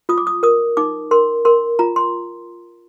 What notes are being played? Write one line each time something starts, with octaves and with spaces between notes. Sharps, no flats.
F4 D#6
D6
D#6
A#4 D#6
D#4 D6
A#4 C6
A#4 C6
F4 A#5
C6